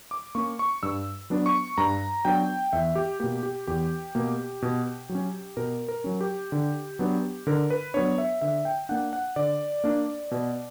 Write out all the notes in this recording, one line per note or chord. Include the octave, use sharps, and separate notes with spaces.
D6
A#3 C#4 C#6
C#6
G2 E6
F#3 B3 D4
C#6
G2 A#5
F#3 B3 D4 G5
E2 E5
G4
B2 A#3 G4
G4
E2 G4
B2 A#3
B2
F#3
C#4
B2 A#4
A#4
F#3 C#4
G4
D3
F#3 B3 D4
D3 A#4
B4
F#3 B3 D4 C#5
E5
D3 E5
G5
A#3 D4 F#5
F#5
D3 D5
A#3 D4
B2